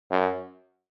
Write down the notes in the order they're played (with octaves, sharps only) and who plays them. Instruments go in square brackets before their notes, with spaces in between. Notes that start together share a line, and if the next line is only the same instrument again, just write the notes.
[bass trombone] F#2